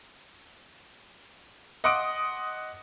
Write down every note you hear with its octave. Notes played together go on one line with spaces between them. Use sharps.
D#5 F#5 C6 D6 D#6 D7